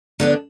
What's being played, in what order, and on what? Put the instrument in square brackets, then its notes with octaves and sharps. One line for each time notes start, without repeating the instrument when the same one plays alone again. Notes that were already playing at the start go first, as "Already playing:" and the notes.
[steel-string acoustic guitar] D3 B3 D4